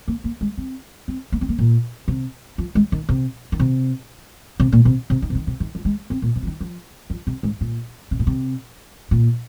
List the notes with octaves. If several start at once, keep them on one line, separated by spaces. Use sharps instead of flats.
A#3
A#3
G#3
C4
C4
A#3
C4
A#3
A#2
C3
F3
G#3
D#3
C3
D#3
C3
C3
A#2
C3
C3
D#3
C3
D#3
C3
D#3
F3
G#3
C4
A#2
C3
F3
D#3
F3
F3
C3
G#2
A#2
C3
A#2
C3
A#2